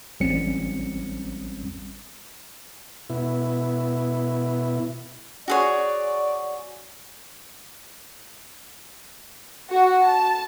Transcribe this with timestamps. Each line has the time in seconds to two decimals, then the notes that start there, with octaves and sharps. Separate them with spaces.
0.20 A1 G3 C4 C#4 C#7
3.10 B2 E4
5.48 F#4 G#4 C#5 D5
9.70 F#4
10.03 A5